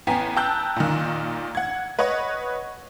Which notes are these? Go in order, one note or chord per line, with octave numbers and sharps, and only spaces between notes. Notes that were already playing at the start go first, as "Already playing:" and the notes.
A1 B3 G5 G#5 A#5 B6
G5 A5 A#5 E6 F#6 G6
A#2 D#3
F#5 G#6
B4 C#5 D#5 F#5 C#6